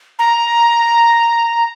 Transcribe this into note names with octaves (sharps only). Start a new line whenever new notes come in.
A#5